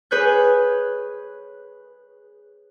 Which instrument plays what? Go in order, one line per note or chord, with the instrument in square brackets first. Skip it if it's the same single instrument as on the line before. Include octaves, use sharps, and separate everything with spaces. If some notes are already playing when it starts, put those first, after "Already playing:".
[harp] G#4 B4 C#5 F#6 G6